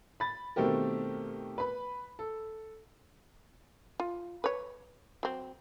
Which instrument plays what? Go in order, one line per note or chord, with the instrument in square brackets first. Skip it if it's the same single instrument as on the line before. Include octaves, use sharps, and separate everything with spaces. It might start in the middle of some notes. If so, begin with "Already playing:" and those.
[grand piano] B5 A6
B2 D#3 A3 C4 G4 A#4
B4 B5
A4
[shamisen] F4
B4 C#5
F#3 C4